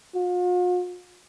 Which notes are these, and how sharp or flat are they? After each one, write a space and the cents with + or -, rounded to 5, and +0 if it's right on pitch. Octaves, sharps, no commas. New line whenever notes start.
F4 +45